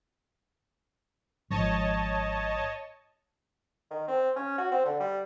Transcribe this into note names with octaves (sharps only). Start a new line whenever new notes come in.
G#1 G#2 F3 C#5 D#5 A5
D#3
C4
C#4
F#4
C4
D3
G3